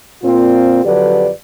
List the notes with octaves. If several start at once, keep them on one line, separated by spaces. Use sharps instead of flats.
A#2 C4 F4
F2 D3 F#3 G4 B4 D5